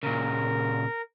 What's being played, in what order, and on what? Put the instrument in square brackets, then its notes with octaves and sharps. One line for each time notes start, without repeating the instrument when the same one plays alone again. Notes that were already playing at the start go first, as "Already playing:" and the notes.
[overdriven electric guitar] A#2 C#3 [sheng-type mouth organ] A#4